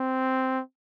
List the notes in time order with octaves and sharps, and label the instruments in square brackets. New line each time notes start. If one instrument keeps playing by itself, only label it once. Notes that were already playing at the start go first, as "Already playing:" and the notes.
Already playing: [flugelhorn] C4